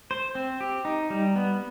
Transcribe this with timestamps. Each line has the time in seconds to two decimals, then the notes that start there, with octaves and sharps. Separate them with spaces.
0.11 C5
0.35 C4
0.61 G4
0.85 D#4
1.10 G3
1.36 B3